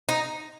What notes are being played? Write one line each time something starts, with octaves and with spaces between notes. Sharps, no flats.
D#4